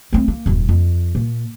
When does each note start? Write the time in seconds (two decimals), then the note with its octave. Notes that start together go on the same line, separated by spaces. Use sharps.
0.13 A3 C4
0.28 A#3
0.46 D#1 F#2
0.69 F2
1.15 A#2